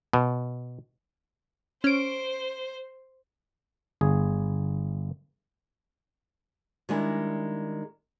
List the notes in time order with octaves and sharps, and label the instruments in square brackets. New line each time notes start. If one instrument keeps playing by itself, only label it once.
[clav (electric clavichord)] B2
[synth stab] C#4 D7 [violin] C5
[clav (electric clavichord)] G1 G#4
[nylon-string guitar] D#3 G3 G#3 D4 E4